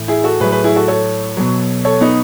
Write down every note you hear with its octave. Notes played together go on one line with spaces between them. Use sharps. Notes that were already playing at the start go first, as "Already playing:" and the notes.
Already playing: A2 E3
E4 G#4
F#4 A4
A2 F#3 G#4 B4
G#4 B4
E4 G#4
F#4 A4
A4 C#5
B2 F#3
A4 C#5
B3 D#4